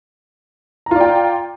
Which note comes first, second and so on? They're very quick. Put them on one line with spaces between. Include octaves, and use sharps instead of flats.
A#5 F4 D5 G5